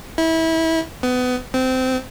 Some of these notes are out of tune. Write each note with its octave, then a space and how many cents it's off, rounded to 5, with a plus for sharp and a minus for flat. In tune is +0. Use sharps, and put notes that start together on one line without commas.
E4 -25
B3 +25
C4 -20